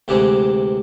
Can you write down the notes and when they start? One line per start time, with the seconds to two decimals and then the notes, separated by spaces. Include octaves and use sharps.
0.08 D2 C3 E3 G#3 G4